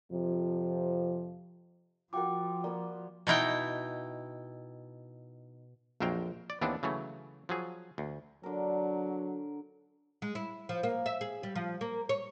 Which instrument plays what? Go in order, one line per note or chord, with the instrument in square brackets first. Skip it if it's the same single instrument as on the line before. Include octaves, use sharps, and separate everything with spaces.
[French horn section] F2 C3 F3
[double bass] F3 [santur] F4 F#4 A#4 [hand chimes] G5 D6
[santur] A#3 A#4 B5 [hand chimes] D5
[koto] B2 D#4 E4 G5
[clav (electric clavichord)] A#1 F2 F#3 A#4 C5 G5
D5
D#2 E3 B3 C4 D4
C#3 E3 F#3 A3
F3 F#3 G#4
D2
[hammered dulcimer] D3 A#4 [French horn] F#3
[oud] G#3
E4
F3
A#3
E5
G#4
G3
F3
A#3
C#5